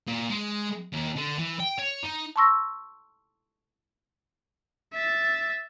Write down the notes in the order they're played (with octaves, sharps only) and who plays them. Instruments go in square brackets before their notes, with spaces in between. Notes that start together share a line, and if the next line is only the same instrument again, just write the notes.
[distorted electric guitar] A#2
G#3
D#2
D3
E3
G5
C#5
D#4
[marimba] A5 C6 C#6 E6 A#6
[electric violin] E5 A6